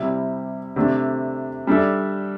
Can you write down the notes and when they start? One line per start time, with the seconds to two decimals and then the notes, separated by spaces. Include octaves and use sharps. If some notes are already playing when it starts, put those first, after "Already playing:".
Already playing: C3 G3 E4
0.76 C3 A3 D4
1.67 G3 D4 A4 E5